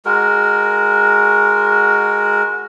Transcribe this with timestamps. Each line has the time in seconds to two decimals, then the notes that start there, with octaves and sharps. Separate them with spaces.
0.05 G#3 F#4 A#4